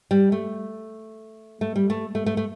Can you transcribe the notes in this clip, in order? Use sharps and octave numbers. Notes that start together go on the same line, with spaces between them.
G3
A3
A3
G3
A3
A3
A3
A3